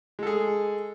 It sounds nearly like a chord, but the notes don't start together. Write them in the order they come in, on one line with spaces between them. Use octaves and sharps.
G#3 A4 G#4